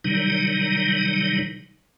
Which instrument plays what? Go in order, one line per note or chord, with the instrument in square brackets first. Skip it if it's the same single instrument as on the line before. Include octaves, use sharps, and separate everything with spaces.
[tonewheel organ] C3 D#3 F#3 G3 D#4